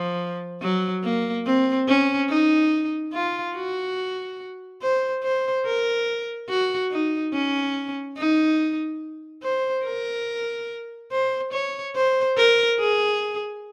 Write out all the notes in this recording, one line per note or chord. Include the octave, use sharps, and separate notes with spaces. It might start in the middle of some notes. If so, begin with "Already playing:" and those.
Already playing: F3
F#3
A#3
C4
C#4
D#4
F4
F#4
C5
C5
A#4
F#4
D#4
C#4
D#4
C5
A#4
C5
C#5
C5
A#4
G#4